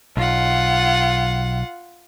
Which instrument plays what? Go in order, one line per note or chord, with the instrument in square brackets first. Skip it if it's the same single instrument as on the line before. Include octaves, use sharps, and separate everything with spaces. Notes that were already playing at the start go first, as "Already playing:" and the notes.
[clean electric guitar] B1 [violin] F4 F#5